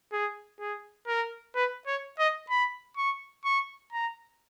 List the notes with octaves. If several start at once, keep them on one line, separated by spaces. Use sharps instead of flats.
G#4
G#4
A#4
B4
C#5
D#5
B5
C#6
C#6
A#5